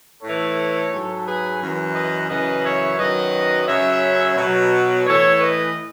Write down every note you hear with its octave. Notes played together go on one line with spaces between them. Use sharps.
A2 E3 A4 C#5
G#2 F#3
G#4 B4
F#2 E3
B4 D#5
F#2 C#3 E3 B4 D#5
C#5 E5
F#2 D#3 F#3 B4 D#5
F#2 C#3 F#3 C#5 E5
B2 F#3
A2 E3 A4 C#5
B4 D#5